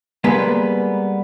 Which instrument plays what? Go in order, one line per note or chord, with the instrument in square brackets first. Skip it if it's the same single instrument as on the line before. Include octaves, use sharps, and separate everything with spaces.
[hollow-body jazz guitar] G3 G#3 A#3 B3 B4